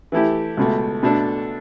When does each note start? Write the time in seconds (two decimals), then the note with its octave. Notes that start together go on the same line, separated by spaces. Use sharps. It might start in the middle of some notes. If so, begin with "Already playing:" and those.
0.12 E3 A3 E4 G4
0.57 C#2 B2 A3
1.03 B2 A3 D4 A4